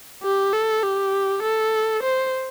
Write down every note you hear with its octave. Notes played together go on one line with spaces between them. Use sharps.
G4
A4
G4
A4
C5